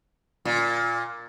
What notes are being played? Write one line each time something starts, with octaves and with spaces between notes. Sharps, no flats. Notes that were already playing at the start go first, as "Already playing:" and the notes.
A#2